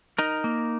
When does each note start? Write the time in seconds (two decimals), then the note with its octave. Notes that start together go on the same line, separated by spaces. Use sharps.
0.18 D#4 A#4
0.44 A#3